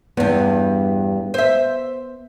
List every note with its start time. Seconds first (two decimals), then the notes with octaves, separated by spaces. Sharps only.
0.17 E2 G2 B3
1.34 C5 E5